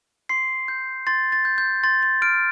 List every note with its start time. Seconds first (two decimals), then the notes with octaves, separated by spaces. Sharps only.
0.29 C6 C7
0.68 G6
1.07 C6 A6
1.32 A6
1.45 G6
1.58 G6
1.83 C6 A6
2.03 A6
2.22 F6 D7